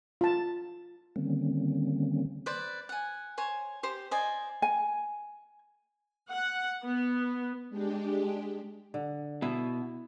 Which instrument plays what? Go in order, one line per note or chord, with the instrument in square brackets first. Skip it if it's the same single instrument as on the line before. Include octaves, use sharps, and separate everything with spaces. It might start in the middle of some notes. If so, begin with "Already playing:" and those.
[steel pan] F4 A5
[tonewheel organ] D3 D#3 G3 A#3 C4 C#4
[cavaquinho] B4 C5 D5
F#5 G#5
C5 C#5 G#5
G4 C5
C5 D5 D#5 G#5
[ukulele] G#5
[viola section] F#5
B3
[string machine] G#3 D4 G4
[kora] D3
[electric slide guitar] B2 [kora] E4